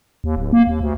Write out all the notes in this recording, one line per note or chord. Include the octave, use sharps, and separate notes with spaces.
D#2
D1
A#3
D#2
D2